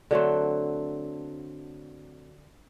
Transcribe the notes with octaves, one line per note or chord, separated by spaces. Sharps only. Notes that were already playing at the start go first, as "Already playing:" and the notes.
D3 F#3 A3 C4